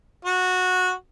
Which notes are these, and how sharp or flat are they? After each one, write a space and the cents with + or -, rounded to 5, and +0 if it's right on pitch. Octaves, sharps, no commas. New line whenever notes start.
F#4 -15